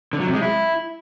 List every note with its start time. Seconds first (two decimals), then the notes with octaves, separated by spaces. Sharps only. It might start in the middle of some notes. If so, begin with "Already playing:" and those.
0.13 D3
0.20 F#3
0.27 C3
0.34 G#3
0.41 E4